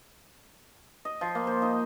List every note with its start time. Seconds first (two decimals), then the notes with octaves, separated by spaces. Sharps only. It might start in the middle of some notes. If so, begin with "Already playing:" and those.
1.05 D#5
1.21 F3
1.35 A#3
1.47 C5
1.62 D#4